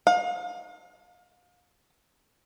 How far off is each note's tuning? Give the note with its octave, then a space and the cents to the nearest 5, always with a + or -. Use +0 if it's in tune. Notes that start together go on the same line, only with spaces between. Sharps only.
F5 +35